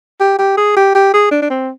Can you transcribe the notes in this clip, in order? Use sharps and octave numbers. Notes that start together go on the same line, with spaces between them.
G4
G4
G#4
G4
G4
G#4
D4
D4
C4